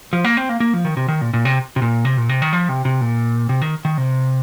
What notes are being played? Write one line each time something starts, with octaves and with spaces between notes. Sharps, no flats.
F3
A#3
C4
A#3
A#3
F3
D#3
C3
D#3
A#2
A#2
C3
C3
A#2
C3
A#2
C3
D#3
F3
C3
C3
A#2
C3
D#3
D#3
C3